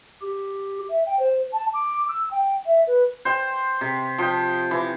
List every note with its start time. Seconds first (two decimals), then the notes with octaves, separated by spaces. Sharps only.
0.22 G4
0.89 E5
1.06 G5
1.19 C5
1.53 A5
1.74 D6
2.09 E6
2.31 G5
2.66 E5
2.87 B4
3.25 C5 G5
3.81 C3
4.18 F3 G5
4.71 E3